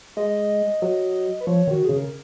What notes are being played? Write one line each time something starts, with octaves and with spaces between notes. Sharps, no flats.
G#3 D#5
F#3
B4
F3 C#5
D#3 F#4
C#3 G#4
A#4